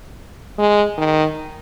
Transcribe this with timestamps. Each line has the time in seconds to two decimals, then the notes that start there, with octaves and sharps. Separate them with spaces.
0.58 G#3
0.98 D#3